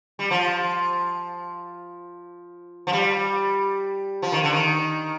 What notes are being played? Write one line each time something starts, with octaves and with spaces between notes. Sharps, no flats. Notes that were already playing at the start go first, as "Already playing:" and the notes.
G3
F3
F3
G3
F3
D#3
D3
D#3